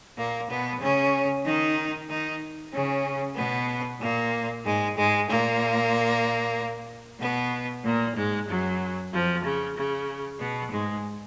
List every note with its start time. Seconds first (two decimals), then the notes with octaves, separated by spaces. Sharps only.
0.17 A#2 A#3
0.50 B2 B3
0.81 C#3 C#4
1.45 D#3 D#4
2.09 D#3 D#4
2.73 C#3 C#4
3.37 B2 B3
4.01 A#2 A#3
4.64 G#2 G#3
4.96 G#2 G#3
5.28 A#2 A#3
7.20 B2 B3
7.84 A#2 A#3
8.15 G#2 G#3
8.48 F#2 F#3
9.12 F2 F3
9.44 C#3
9.76 C#3
10.40 B2 B3
10.71 G#2 G#3